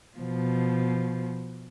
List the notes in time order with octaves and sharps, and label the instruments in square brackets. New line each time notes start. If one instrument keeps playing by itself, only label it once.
[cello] B2 F3